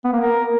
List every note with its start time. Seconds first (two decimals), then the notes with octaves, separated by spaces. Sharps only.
0.05 B3
0.13 A#3
0.21 A#4